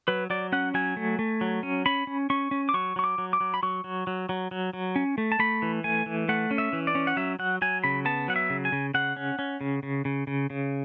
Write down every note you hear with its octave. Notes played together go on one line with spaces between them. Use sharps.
F#3 B4
F#3 D5
C#4 F#5
F#3 G#5
A3
A3
F#3
C#4
C#4 B5
C#4
C#4 C#6
C#4
D6
F#3 C#6
F#3 C#6
D6
F#3
D6
F#3
B5
F#3 C#6
F#3
F#3
F#3
F#3
F#3
C#4
A3
A5
A3 B5
E3
A3 G#5
E3
A3 F#5
C#4
E5
E3
D5
C#4
F#5
F#3 E5
F#3 F#5
F#3 G#5
C#3 B5
B3 A5
F#3 F#5
E5
C#3
G#5
C#3
C#3 F#5
C#4
C#4
C#3
C#3
C#3
C#3
C#3